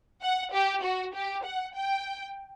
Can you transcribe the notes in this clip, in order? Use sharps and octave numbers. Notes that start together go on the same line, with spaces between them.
F#5
G4
F#4
G4
F#5
G5